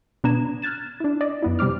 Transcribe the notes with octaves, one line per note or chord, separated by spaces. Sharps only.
B2 B3 D4 A#5 G#6 E7
F6 F#6 G#6 A6 E7
D4 E4
D5 D#5
F#2 B3 E4
C3 G3 C5 D6 F6